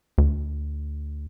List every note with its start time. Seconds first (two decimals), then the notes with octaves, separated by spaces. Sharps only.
0.18 D2